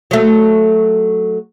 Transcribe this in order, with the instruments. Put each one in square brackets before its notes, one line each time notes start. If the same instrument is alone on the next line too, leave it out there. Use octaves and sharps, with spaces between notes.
[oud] F#3 A3